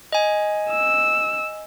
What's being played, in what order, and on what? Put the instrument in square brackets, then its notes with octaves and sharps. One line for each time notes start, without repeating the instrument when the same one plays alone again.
[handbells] D#5 G#5
[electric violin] E6